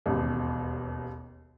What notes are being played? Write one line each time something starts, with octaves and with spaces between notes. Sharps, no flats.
E1 A1 D#2